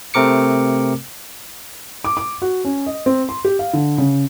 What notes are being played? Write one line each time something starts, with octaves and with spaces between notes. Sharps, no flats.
C3 A3 C4 A#4 D6 C#7
D6
D6
F#4
C#4
D#5
C4
C6
G4
F5
D3
C#3